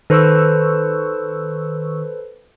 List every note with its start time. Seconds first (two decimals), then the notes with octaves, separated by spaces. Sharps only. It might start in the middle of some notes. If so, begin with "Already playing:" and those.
0.10 D#3 A4 B4 C5 C#6 E6